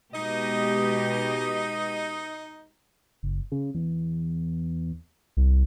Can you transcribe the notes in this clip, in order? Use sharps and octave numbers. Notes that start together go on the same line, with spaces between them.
B2 G#3 D#4 G4 D#5
F#1
C#3
E2
C2